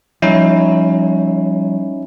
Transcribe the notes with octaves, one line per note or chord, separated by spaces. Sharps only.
F3 G3 C#4 D#4 E4